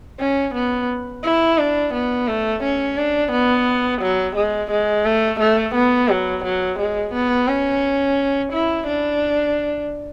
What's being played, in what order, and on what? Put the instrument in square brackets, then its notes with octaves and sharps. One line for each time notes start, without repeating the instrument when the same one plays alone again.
[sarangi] C#4
B3
E4
D4
B3
A3
C#4
D4
B3
F#3
G#3
G#3
A3
A3
B3
F#3
F#3
G#3
B3
C#4
E4
D4